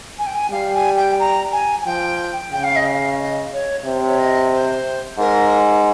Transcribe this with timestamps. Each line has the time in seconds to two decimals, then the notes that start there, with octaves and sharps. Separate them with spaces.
0.18 G#5
0.26 G5
0.34 G#5
0.51 G3 F5
0.74 G#5
0.96 G5
1.19 A#5
1.52 G#5
1.81 G#5
1.85 F3 G5
2.52 C#3 G5
2.63 F5
2.75 D#5
2.87 F5
3.18 D#5
3.52 C#5
3.85 C3 C5
4.07 C#5
4.18 D#5
4.52 C5
5.19 G#2 A#4